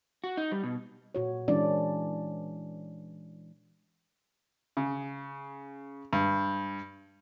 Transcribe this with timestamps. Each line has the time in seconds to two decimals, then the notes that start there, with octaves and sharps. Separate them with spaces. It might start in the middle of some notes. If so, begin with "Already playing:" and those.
0.24 F#4
0.37 D#4
0.52 G3
0.64 B2
1.15 A#2 F#4 C#5
1.48 E3 G#3 C#4 D4 D5
4.77 C#3
6.13 G2